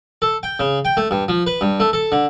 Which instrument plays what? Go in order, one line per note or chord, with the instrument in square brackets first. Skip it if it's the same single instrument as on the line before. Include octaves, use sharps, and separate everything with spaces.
[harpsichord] A4
G5
C#3
G5
A3
G2
F3
B4
G2
A3
A4
D3